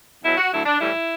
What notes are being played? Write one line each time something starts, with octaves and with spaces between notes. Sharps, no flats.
E2 B2 F#3 E4
F#4
D2 D3 F#3 E4
D4
A2 E3 G3 E4